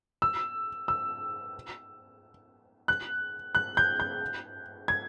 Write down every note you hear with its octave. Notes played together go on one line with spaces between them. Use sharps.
E6
E6
F#6
F#6
G6
G6
G#6